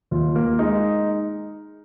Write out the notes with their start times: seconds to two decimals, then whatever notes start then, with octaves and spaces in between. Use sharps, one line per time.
0.11 D#2 F4
0.35 A#3
0.59 G#3 D#4